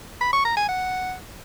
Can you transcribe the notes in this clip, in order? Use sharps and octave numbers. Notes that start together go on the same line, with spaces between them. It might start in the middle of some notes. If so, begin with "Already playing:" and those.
B5
C#6
A#5
G#5
F#5